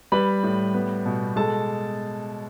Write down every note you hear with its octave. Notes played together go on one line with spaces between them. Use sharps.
G3 B4 B5
A2
B3
B2
G#3 A4 A5